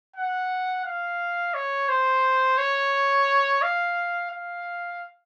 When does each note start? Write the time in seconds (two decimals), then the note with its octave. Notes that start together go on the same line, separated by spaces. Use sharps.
0.16 F#5
0.85 F5
1.54 C#5
1.89 C5
2.58 C#5
3.62 F5
4.31 F5